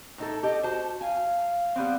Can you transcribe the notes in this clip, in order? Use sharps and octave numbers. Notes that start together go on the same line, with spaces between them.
A2 D#4 A4
G4 A4 D#5
F#4 C5 A5
F5 G#5
G3 B3 C4